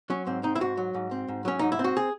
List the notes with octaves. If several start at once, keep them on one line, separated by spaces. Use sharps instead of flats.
F#3 C#4
G#2 C4
C4 D#4
E4
G#2 F#4
F#3
G#2
C4
G#2
F#3 C#4
G#2 D#4
E4
C4
F#4
G#4